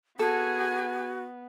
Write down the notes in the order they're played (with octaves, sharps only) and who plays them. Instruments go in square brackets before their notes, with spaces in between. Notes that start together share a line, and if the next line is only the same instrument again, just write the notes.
[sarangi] B3 [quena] F#4 [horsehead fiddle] G#4 G#5 [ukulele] A4